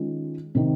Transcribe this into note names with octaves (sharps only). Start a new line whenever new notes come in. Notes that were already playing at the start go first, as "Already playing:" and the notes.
Already playing: D#3 G#3 C#4 F4
C3 D#3